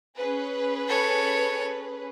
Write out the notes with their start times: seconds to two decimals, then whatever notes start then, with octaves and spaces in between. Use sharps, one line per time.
0.17 C#4 G#4 B4
0.88 A4 C#5